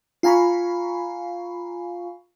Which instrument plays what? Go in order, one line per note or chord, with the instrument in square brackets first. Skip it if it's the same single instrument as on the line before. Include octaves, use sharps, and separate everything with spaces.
[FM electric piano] F4 F5 G#5 A#5 B5 C#6